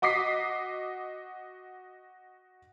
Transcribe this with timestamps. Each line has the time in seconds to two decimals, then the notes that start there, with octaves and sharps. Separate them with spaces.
0.02 F#4 D#5 D6 B6 C7